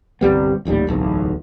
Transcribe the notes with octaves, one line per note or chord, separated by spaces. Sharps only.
G1 C2 G3 B3
D#1 A1 D#2 G3
D1 B1 E2